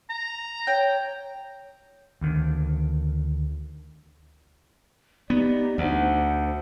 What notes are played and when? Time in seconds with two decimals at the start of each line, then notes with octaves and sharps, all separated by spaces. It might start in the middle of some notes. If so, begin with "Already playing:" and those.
0.10 A#5
0.67 C#5 G5
2.21 D2 D#3
5.30 B3 D#4 G4 D5
5.78 D2 C5 F#5